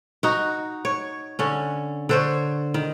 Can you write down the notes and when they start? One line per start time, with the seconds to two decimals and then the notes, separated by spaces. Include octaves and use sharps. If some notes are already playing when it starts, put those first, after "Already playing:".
0.23 D#4 F#4
0.85 C#5
1.39 D3 C#4
2.09 D3 C5 C#5
2.74 D#3